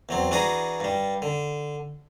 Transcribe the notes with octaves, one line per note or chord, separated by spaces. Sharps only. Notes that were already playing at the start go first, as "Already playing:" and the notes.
E2 F#3 C4
E3 D4 F#4 G#4 A#5
G2 G3
D3